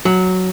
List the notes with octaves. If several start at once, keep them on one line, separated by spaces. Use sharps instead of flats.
F#3